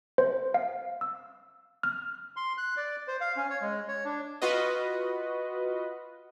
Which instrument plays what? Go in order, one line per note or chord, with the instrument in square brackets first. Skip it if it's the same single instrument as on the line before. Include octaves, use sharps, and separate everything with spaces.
[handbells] C5
F5
E6
F6
[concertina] C6
F#6
D5
C5
F5
C#4
C#5
G#3
C#5
D4
[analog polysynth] F4 F#4 B4 D#5